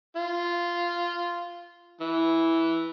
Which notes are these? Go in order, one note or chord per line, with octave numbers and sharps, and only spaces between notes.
F4
E3